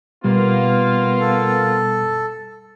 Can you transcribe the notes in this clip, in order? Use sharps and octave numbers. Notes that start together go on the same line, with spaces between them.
B2 G3 A#3 B3 F4
A4